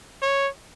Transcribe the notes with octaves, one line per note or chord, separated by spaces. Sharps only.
C#5